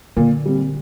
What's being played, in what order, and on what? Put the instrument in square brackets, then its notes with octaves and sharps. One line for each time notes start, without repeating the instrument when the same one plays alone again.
[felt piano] A#2 [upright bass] D3
[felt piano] G3 C4